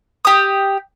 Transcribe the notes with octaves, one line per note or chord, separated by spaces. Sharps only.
G4 D#6